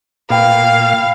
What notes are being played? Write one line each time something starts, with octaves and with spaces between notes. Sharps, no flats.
A#2 B4 F5 G5